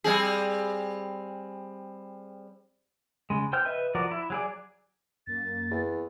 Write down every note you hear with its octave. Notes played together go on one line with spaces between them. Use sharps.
G3 C4 G#4
C#3 G#3
C5 G5 F6 G6
B4 D#5 E5
F3 F#4 A#4 D5
E4
F#3 G#4 D5
F#2 A#3 A6
E2